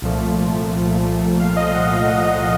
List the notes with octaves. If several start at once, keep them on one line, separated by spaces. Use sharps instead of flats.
C2 A#2 F3 A3
F5
D#5
F#5
F#5
F#5